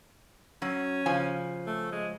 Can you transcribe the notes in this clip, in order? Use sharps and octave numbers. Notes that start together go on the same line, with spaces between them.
F#3 C#4
C#3 F3 G#5
A3
G#3